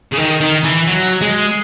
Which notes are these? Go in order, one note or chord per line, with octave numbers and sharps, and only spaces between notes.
C#3
D#3
D#3
E3
F#3
G#3